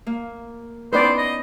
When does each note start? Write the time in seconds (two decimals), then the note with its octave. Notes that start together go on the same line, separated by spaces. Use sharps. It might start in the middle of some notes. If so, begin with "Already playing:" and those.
0.07 A#3
0.93 B3 C#4 D#4 B4 C5 D5
1.18 D#5